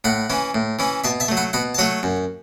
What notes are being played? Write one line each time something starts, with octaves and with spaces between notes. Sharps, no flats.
A2 F#5 B5
E3 C#4 E4
A2
E3 C#4 E4
B2 E5 A5
E5 A5
F#3 A3
F#5 B5
B2 F#5 B5
A5
F#3 A3 C#5 F#5
F#2